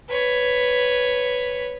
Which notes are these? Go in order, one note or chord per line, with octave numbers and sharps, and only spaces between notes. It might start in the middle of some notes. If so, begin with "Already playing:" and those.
B4 C#5